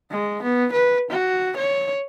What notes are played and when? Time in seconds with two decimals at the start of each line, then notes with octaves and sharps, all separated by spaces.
0.11 G#3
0.43 B3
0.72 B4
1.10 F#4
1.57 C#5